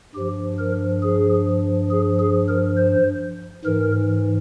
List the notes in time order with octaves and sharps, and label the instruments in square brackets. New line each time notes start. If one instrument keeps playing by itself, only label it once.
[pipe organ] G2 F3 G4
A#4
G#4
G#4
G#4
A#4
C5
G#2 E3 A#4